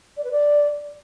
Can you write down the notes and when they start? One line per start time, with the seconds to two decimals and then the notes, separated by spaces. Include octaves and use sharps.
0.17 D5
0.24 B4
0.31 D5